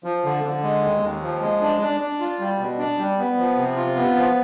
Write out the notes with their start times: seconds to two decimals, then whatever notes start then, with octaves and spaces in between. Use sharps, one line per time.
0.04 F3
0.24 D3
0.44 D3
0.63 G#3
0.83 D#2
1.02 D#2
1.23 F3
1.41 G#3
1.60 D4
1.81 D4
2.00 D4
2.20 F4
2.39 G3
2.58 B2
2.79 D4
2.98 G3
3.18 B3
3.37 F3
3.57 C3
3.76 F4
3.96 B3
4.15 F3